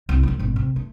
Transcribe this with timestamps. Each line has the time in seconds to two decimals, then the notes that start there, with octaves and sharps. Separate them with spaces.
0.09 C2
0.23 F3 A3
0.39 G#1 B2
0.56 C3
0.76 A3